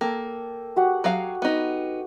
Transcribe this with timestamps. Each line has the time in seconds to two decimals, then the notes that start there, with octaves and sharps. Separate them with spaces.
0.01 A#3 A4 G5
0.76 F#4 G4 F#5
1.04 F#3 G#4 F5
1.42 B3 D#4